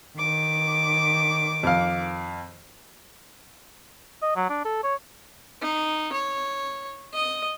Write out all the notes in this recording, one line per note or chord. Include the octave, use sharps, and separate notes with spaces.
D#3 D6
F2 F5
D#5
F#3
D4
A4
C#5
D#4
C#5
D#5 D#6